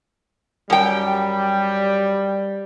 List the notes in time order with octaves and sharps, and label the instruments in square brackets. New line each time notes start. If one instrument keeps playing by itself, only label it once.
[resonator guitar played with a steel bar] F#2 G5 [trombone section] G3